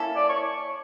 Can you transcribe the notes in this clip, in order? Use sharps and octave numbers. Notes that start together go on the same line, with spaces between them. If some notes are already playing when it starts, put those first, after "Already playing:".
Already playing: A#3 C#4 E4 A4
D5
C#5